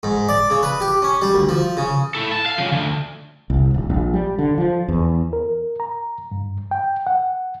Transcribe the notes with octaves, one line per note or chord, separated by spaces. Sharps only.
G#2
D5
C#3
B4
G4
C#4
G3
D2
F3
C#3
E4 A4
A5
F5
C#3 F3
D2
C2
D#1
A#1
G3
D3
F3
E2
A#4
A#5
G2
G5
F#5